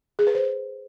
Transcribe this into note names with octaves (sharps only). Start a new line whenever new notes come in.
G#4
B4
C5